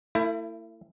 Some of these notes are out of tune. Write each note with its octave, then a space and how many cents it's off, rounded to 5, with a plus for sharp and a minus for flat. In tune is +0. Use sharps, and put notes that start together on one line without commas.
A3 +40 E4 +15